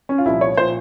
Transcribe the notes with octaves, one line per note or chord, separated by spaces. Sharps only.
C#4
F4
C2 A#2 F3 E4
C#5
A#2 F3 C5